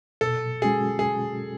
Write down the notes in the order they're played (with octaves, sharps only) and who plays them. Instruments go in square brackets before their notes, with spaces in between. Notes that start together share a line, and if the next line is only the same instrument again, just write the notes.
[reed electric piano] B2 [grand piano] A4
[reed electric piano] G#3 C#4 F#4 [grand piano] G#4
[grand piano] G#4